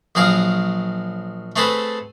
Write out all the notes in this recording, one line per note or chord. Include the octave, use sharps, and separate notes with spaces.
A#1 F#3 G#4 A#4 F5
A3 C4 G#4 A4 B4